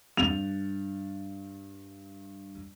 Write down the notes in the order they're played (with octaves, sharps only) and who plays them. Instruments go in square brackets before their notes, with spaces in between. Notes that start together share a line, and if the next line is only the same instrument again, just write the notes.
[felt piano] G2 [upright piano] F7